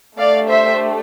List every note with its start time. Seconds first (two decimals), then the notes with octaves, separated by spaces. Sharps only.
0.17 A3 D4 G4 D5 F5
0.48 C5 E5